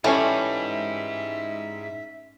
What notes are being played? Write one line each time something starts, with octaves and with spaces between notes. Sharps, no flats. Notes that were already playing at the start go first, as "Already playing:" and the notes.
G#2 E3 G3 A3 C#4 C#5 E5